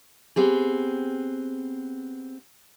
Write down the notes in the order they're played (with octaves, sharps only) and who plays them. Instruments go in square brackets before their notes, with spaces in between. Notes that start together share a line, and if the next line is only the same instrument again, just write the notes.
[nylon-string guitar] B3 C4 G4 G#4